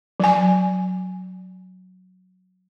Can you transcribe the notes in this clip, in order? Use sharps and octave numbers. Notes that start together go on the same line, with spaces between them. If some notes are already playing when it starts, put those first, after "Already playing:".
F#3 G#5